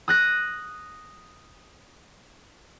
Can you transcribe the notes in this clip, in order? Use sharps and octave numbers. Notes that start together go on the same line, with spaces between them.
D#6 F#6 A#6